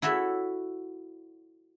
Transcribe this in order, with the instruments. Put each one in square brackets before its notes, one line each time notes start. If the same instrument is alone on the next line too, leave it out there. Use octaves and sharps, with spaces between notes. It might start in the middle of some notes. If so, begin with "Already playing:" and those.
[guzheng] E4 F#4 A4 C#5 E5